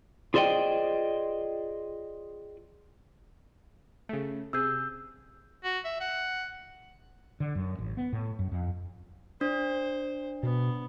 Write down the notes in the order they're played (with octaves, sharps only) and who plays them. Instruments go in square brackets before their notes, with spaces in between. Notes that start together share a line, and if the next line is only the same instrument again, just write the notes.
[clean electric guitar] F4 G#4 C5 D5 D#5 G5
[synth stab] C#3 A3
[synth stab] C3 G#4 [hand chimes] E6 G6
[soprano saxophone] F#4
E5
F#5
[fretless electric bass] D3
F#2
A1
B3
A2
F#2
F2
[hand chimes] D4 [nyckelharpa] C5
[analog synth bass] B2 [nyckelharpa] B3